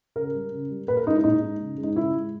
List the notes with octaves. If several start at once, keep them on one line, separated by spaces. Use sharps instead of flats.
C#3 A#4
G3
C#3
G3
A#2 B4
A#4
G#3 D#4
E4
A#2 D#4
G#3
C#3
G#3
D#4
C#3 E4
G#3